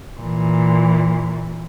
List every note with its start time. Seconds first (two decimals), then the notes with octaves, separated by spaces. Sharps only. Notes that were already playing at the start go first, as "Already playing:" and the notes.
0.21 A#2 E3